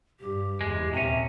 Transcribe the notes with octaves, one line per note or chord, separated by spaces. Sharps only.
G2 G4
F#1 E2 G#3
A#1 D#2 C3 C#4 E5